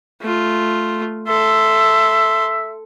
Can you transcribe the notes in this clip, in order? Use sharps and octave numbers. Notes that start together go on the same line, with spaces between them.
A3 F4
A4 E5 C6